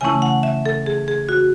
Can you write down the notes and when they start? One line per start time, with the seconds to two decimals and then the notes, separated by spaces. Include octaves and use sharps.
0.01 C#3 E3 A3 C#4 E4 G#5
0.22 F#5
0.43 E5
0.66 A4
0.86 G#4
1.08 G#4
1.29 F#4